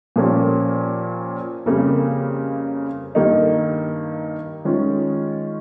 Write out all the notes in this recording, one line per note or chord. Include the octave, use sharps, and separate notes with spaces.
A#2 F3 A#3 C#4 G4
F2 C#3 G3 A#3
G2 D#3 A#3 D#4
D#3 G#3 C#4 F4